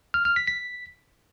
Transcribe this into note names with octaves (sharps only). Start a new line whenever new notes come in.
F6
F6
B6
B6